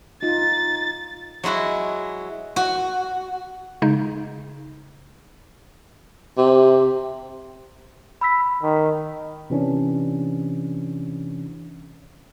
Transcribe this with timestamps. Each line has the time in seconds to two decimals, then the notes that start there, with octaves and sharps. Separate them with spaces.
0.22 D#4 F4 A6
1.44 F#3 G#3 E4 F#4
2.56 F#4
3.82 C#3 G#3 D#4
6.38 C3
8.21 B5 E6 B6
8.63 D#3
9.50 C3 E3 C#4 D4